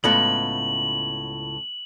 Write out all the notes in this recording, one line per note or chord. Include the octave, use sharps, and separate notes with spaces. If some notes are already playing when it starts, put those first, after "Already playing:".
C#2 A2 B3 F#7